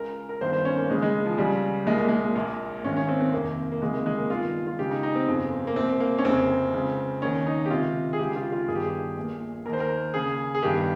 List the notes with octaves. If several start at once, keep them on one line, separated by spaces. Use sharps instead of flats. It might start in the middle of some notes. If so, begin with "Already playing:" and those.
Already playing: C#2 C#3 A#4
A#4
G1 G2 D#3 C5
C5
C#4
A#3
C#2 C#3 G#3
G#3
F3
C#2 C#3 G3
C2 A#2 G#3
A#3
G#3
A#1 A#2 A#3
G#1 G#2 D#3 C#4
C#4
C4
C4
F1 D#2 D#3 A#3
A#3
C#2 C3 D#3 G#3
A#3
G#3
A#3
G1 G2 D#3 F4
F4
C#2 C#3 G4
D#4
D#4
C4
G1 F2 C#3
A#3
C2 A#2 C4
A#3
C#4
F1 F2 C#3 C4
C#2 C#3
D#2 D#3 C#4
D#4
G4
C#2 C3 D#3 F4
G#4
C#2 C#3 G4
F4
F4
G1 G2 D#3 G#4
G4
G#4
A#1 A#2
D#2 D#3 A#4 C5
A#4
D#2 C#3 G#4
G#4
G1 G2 D#3 G4